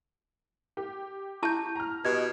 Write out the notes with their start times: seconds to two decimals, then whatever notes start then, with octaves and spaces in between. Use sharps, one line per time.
0.77 G4
1.43 E4 A5 C#6 G6
1.75 A#5 F6
2.05 B2 G4 D#5 G#6